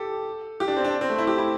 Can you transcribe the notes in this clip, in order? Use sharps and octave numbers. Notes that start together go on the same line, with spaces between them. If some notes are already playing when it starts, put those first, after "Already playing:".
Already playing: G4 A4
G4
D4
C4
D4
C4
A3
E4
G4
E4